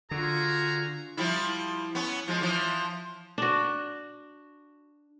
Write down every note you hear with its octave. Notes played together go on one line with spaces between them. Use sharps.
D3 F4 F#4 G#4 A#5
F3 G3 E4
B3 C#4
F3 G#3
E3 F3
D4 F#4